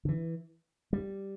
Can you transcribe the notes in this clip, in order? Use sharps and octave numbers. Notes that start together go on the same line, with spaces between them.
D3
E3
G3